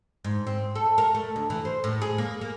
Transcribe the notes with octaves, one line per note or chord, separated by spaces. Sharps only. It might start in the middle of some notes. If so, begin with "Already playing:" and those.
G#2
C4
A4
A#4
A3
D2
E3
C5
A2
G#4
A#3
A#3